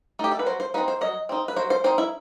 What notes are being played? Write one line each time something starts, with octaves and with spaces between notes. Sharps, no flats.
A3 D#4 G4
A4
B4
F#3 C5
C5
C4 D#4 B4
C5
F#3 D#5
C4 D#4
B4
F#3 C5
C5
C4 D#4 C5
E4